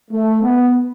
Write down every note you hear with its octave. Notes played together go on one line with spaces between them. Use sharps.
A3
B3